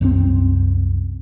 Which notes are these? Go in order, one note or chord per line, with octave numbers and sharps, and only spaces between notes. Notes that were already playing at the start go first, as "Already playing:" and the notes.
C2 F#2 F#3 C4